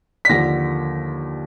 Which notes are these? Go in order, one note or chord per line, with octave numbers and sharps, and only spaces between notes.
B6
D#2 D3 F3 A#6